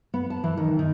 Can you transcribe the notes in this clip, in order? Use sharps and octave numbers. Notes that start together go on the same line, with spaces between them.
B3
A5
E3
D#3
D#3